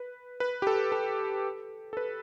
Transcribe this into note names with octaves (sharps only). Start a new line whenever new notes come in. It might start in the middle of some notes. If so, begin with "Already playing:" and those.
Already playing: B4
B4
G4
A4
A4
A4
B4